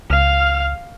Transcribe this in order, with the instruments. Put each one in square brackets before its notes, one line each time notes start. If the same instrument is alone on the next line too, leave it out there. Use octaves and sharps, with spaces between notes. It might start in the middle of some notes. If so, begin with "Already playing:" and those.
[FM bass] C#2 [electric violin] F5 F6